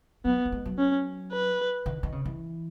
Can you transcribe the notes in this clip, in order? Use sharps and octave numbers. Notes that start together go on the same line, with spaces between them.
F#3 B3
F#3
G#3
F#3
C#4
B4
D#3
D#3
C#3
E3